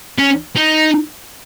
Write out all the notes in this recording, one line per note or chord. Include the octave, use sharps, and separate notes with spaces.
C#4
D#4